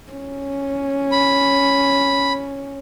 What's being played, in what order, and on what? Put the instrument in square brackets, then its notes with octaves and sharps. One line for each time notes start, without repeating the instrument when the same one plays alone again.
[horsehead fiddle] C#4
[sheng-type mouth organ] B5